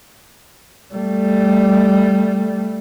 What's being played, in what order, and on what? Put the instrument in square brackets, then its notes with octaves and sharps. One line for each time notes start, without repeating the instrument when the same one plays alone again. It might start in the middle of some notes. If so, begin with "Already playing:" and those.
[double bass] G3 A3